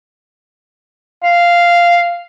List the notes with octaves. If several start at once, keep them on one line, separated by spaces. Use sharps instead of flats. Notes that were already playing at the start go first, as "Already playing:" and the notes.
F5